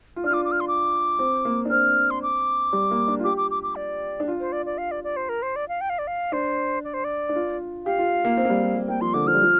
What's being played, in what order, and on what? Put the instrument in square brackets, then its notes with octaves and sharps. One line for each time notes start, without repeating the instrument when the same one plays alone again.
[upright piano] F4
[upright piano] D4 [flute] F6
[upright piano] F4 [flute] D6
[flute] D6
F6
C6
D6
[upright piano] C4
A#3
D4
[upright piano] C4 [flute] F6
[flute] C6
D6
[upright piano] G3
A#3
D4
F4
[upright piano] G4 [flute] D6
[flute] D6
D6
D6
D5
[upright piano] D4
F4
[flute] C5
D5
D5
F5
D5
D5
C5
A#4
C5
D5
F5
G5
F5
D5
F5
[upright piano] D4 [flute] C5
[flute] D5
C5
D5
[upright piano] D4
F4
[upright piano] G4 [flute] F5
[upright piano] F4
A#3
C4
A#3
G3
G3
G3
[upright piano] A#3 [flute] G5
[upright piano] F3 [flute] C6
[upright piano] D3 [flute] D6
[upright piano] F3 [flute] F6
[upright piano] G3
F3